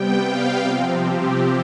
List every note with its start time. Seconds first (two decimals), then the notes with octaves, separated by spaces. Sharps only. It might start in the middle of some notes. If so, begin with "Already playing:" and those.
Already playing: C3 G3 B3 G5
0.25 F5
0.63 C3 F3 C4
1.01 G4